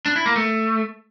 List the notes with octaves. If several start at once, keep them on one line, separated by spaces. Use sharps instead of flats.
D4
E4
A#3
A3